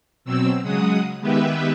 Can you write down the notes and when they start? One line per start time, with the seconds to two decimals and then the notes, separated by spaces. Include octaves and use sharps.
0.25 B2 F#3 C4 E6
0.62 C#3 F#3 G#3 F#4 D#6
1.20 D#3 G#3 B3 G4 B4 E5